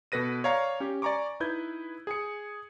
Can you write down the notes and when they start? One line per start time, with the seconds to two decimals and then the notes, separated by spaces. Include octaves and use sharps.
0.12 B2 A4 B4 A#6 D#7
0.44 C#5 D5 F5 A#5 C#6
0.80 C#4 G4
1.02 D5 G#5 A#5 C#6 D6
1.40 D#4 E4 B4 G6 G#6
2.07 G#4 G#5 C#7